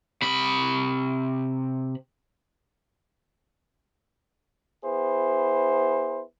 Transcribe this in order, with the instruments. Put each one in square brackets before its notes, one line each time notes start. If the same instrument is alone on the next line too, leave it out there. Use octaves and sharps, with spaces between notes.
[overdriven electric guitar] C3 B5
[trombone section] B3 E4 G#4 C5